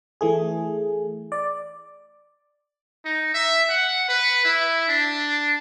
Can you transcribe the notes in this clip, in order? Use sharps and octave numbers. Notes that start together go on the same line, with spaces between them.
E3 A3 G#4
D5
D#4
E5
F#5
B4
E4
D4